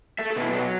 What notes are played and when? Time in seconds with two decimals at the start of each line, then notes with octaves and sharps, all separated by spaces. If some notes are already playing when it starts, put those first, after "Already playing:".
0.19 A3 E5
0.30 A4
0.36 B2
0.42 E4
0.53 F#3 D4